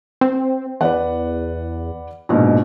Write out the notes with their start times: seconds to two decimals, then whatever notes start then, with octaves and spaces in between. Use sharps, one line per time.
0.21 C4
0.81 E2 B4 D5 F#5
2.29 A#1 G#2 B2